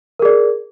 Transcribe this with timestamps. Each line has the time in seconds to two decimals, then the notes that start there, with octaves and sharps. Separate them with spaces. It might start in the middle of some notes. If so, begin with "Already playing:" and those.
0.19 A#4
0.22 G#4
0.25 D5